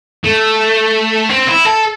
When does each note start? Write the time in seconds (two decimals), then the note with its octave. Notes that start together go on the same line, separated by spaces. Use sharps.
0.24 A3
1.29 C4
1.47 E4
1.65 A4